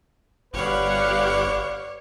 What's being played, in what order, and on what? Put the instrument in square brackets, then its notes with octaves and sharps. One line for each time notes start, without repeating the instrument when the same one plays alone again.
[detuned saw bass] G1 [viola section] G4 F5 F#5 [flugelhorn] B4 [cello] C#5 D5